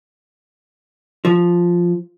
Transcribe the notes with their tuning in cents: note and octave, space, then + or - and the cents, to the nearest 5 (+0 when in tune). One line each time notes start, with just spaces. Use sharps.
F3 +0